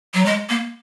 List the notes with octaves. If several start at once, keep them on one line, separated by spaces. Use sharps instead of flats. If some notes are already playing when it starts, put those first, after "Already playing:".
F#3
G#3
A#3